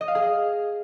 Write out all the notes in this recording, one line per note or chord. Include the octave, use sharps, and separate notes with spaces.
D#5
F5
G#4
D#5